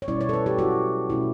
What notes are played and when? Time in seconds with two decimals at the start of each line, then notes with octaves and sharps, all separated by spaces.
0.02 C#5
0.08 B2 G3 C#4 E4 D5
0.21 C#5
0.29 A4
0.33 B4
0.46 G4
0.59 F#3 C#4 E4 F#4
1.09 B2 A3 C#4 E4